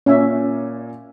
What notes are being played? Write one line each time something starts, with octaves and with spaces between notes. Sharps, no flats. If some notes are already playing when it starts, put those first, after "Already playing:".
A#2 A#3 C#4 E5 G#5